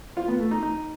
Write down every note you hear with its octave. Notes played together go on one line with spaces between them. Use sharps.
F4
B3
A3
D#4
D#4